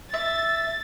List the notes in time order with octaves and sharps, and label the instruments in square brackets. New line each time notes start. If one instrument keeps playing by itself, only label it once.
[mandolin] E5 [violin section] A6